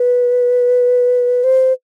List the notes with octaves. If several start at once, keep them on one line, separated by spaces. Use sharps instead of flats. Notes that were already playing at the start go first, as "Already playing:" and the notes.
Already playing: B4
C5